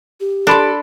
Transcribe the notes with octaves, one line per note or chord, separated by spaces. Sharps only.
G4
D4 A4 D5 B5 C6